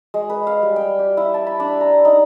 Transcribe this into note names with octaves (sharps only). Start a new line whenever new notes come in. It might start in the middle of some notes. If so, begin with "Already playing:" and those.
G#3
B4
F5
G3
G5
G4
E4
A5
B5
D4
A#5
D#4